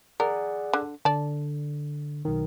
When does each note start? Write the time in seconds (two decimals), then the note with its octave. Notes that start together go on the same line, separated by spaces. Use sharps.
0.20 G#4 A#4 D5 F#5
0.73 D3
1.05 D3 D5 A5
2.25 B1 D#3